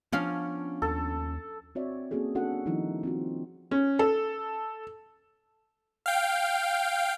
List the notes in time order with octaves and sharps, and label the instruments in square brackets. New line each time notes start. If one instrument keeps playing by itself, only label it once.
[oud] F3 C#4 F5 [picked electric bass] B3 D4
[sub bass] D#2 [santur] A4
[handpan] C4 F#4 C#5 D5 E5
A#3 C4 C#4 F#4 G#4 A4
C#4 D4 F#4 A4 F#5
D#3 F3 G3 D#4 E4
C4 F4 F#4
[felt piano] C#4
A4
[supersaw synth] F5 G5